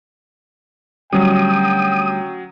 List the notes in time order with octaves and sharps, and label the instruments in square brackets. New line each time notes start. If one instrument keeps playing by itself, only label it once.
[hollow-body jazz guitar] D2 G3 [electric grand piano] F#3 C#4 [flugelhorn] G5 [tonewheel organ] D#6